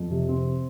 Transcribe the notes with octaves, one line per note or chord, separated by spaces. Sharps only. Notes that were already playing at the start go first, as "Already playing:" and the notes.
Already playing: F2
C3
C4